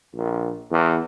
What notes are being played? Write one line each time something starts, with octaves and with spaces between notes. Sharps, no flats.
A#1
E2